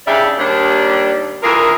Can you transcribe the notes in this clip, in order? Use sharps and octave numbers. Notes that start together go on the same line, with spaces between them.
C#3 D4 E4 G4 D5 E5
D#2 G3 D4
D2 E3 F4 G#4 A#4